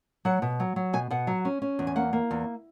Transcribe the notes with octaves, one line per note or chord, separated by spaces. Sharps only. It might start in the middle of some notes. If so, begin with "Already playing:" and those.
F#3 F#5
B2
F#3
F#3
B2 G#5
B2 F#5
F#3
C#4
C#4
E2
G#5
A#3 F#5
A#3
E2